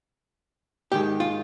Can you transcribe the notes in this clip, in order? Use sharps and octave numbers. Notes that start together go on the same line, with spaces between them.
G#2 D#3 G#3 G4
F4